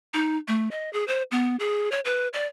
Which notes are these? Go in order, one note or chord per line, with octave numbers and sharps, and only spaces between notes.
D#4
A3
D#5
G#4
C5
B3
G#4
C#5
B4
D5